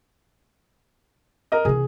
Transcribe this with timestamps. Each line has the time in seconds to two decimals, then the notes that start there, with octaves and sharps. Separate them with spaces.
1.52 A#4 D#5
1.65 C3 E3 G#4